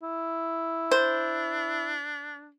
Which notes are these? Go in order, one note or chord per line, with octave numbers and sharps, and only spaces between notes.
E4
D4 C5